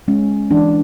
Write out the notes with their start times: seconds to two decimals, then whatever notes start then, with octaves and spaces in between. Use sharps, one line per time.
0.08 G#3 C#4
0.51 E3 D4